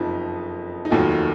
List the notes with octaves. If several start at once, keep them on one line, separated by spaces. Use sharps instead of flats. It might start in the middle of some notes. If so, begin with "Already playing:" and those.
Already playing: F#1 F2 F3 D#4
D#4
F1 D#2 D#3 F#3 F4
F4